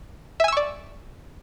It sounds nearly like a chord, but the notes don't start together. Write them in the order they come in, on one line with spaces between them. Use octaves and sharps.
E5 G#5 E6 C#6 D5